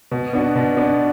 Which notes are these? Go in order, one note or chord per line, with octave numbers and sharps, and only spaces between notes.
B2
B3 D4 F#4
B2
B3 D4 F#4